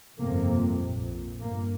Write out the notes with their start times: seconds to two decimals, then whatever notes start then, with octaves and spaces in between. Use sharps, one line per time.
0.18 G1 F2 C3 A#3
0.78 A#1
0.84 A#2
1.39 G1 G2 A#3